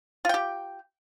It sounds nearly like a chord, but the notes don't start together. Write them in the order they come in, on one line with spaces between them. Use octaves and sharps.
F4 G5 G4